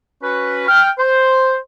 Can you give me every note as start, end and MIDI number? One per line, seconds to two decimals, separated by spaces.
0.23 0.67 61
0.23 0.67 66
0.23 0.67 71
0.68 0.89 79
0.68 0.89 89
0.99 1.56 72